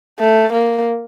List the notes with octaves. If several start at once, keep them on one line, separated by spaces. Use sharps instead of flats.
A3
A#3